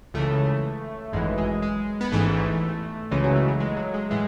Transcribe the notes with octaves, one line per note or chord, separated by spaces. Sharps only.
C#2 C#3 E3 A3
G#1 F#2 E3 G#3
G#3
G#3
B3
A1 G#2 E3 A3
C#2 C#3 E3 G#3
F#3
A3
F#3
G#3
F#3
G#3
A2 E3 G#3